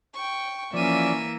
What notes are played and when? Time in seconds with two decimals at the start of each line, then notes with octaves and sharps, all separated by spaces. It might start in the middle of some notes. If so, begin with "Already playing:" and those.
0.14 G5 C#6
0.74 E3 F3 A#3 C#4 D5 E5 D#7